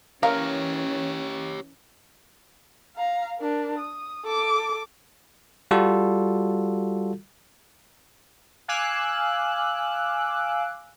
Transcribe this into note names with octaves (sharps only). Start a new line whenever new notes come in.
E3 C#4 G4 A#4 C#5 F5
F5 A#5
D4 A#4
D#6
A4 D6
G3 F4 F#4 A4
F5 G#5 D6 E6 F#6